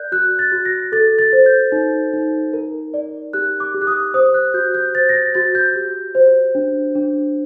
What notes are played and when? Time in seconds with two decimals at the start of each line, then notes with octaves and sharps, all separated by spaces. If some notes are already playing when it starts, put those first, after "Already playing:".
Already playing: A#4 D5 F#6 G6
0.12 F#4 F#6
0.39 A6
0.52 F#4
0.65 A#6
0.92 A4 A6
1.19 A6
1.33 C5
1.46 G6
1.72 D#4
2.13 D#4
2.53 A#4
2.94 D5
3.33 G4 F#6
3.60 D6
3.74 G4
3.81 F#6
3.87 D#6
4.14 C5 D#6
4.34 F#6
4.54 F#4 G6
4.74 G6
4.95 C5 A6
5.09 A#6
5.14 A6
5.34 F#4 A6
5.55 G6
5.76 G4
6.15 C5
6.55 D4
6.95 D4